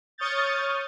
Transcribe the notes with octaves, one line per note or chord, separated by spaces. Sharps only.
C#5 C#6 D#6 F6 G6 A6